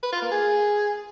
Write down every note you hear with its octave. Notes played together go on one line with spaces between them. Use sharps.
B4
F4
A#3
G#4